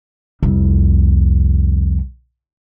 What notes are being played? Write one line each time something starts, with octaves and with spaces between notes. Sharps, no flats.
C2 F2